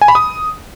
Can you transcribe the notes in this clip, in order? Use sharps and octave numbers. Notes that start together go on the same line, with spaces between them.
G#5
B5
D#6